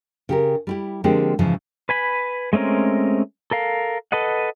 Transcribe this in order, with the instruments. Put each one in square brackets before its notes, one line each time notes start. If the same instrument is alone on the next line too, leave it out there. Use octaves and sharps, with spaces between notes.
[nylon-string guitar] C#3 G4 A#4
G3 E4 G4
D3 F3 G#3 A#3 C4 G4
G#2 C#3 E3 F3
[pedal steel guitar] B4 G#5 B5
G#3 A3 C4 C#4 A#4
A4 A#4 F5
A4 B4 D#5 F#5